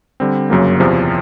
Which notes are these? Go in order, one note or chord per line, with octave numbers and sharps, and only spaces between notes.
D3 G3 C4
G1 F#2 C#3 F#3 A#3
E2 C3 F3